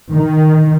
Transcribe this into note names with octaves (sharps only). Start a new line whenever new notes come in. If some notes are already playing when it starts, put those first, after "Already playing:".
D#3